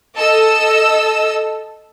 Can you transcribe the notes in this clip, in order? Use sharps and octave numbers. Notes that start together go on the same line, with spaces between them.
A4 D#5 E6